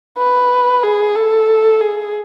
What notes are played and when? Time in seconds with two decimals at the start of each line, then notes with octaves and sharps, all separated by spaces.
0.18 B4
0.83 G#4
1.16 A4
1.81 G#4